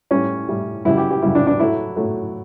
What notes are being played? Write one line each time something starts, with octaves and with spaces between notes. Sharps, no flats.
A2 G3 C#4
A2 G3
F#2 C#3 G3 E4
G4
G4
F#2 C#3 G3 E4
D4
D4
A2 F#3 A3 E4
A2 F#3 A3